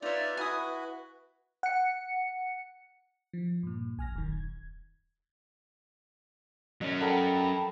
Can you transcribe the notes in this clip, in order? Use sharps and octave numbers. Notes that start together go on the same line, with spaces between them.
D#4 F4 B4 C#5 D5 E5
E4 F#4 G#5 D#6
F#5 C#7
F3
G2 A#2
A#1 G#5 F6 A#6
D#1 F#2 D#3
G#6
F#3 C#4 D#5
A4 A#4 F#5 G5 A5 B5